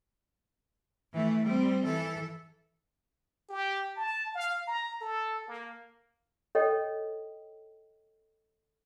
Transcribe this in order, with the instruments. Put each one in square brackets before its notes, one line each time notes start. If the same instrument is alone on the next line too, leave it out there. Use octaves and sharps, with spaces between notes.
[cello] E3 A3
G3 C4
E3 A4
[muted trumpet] G4
A5
F5
A#5
A4
A#3
[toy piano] A4 C#5 D#5 G5